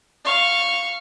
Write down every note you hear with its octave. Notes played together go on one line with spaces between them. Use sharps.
F5 C#6